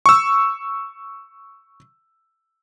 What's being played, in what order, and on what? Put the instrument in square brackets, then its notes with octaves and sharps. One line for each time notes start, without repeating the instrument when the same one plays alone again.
[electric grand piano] C#6 E6